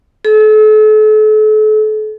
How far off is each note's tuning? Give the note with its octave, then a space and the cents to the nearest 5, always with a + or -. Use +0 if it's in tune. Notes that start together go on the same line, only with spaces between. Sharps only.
A4 -40